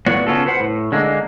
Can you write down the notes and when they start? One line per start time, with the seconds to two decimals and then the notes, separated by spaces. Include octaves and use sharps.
0.06 A2 A#3 B3 F#4 D5 F#5
0.27 C#3 B3 C#4 F4 F#4 A4
0.46 B4 C5 F#5
0.60 A2
0.92 D3 G#3 A#3